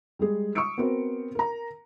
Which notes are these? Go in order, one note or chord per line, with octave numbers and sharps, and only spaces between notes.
G3 G#3 G#4
C#6 D#6 E6 C#7 D7
B3 C4 F#4 A#4 C5
A#4 A#5